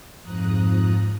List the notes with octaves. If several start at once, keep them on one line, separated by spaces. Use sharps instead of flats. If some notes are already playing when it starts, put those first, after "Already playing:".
F2 G#2 F3 A#5 D#6 F#6